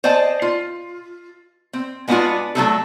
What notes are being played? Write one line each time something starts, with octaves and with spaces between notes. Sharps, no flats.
C5 D5 D#5 G5 A5
F4
C4
G#3 B3 C4 D4 F4 F#4
F#3 A3 D4 D#4 G#4 A4